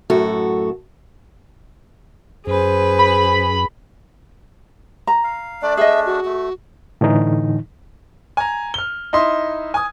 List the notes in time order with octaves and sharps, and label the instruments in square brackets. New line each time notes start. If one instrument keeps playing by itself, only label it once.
[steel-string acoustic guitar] F#2 A2 F#4 A4
[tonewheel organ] F#2 [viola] G#4 B4 [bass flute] C5
[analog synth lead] B5
[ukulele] A#5
[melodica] F5
[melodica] A3 D4 [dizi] D5
[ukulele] G#4 D#5 [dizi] E5
[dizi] F#4
[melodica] A3
[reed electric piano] A2 D3 E3 D#4
[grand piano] G#5 A#5
F6 G7
D#4 E4 D#5 E5 C6
G#5 D#6